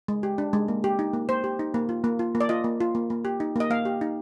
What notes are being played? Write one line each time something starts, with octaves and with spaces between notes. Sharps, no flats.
G#3
G4
D4
G#3
A#3
G4
D#4
A#3
A#3 C5
G4
D#4
A#3
F4
A#3
F4
A#3
D5
F4 D#5
A#3
F4
A#3
A#3
G4
D#4
A#3 D#5
A#3 F5
G4
D#4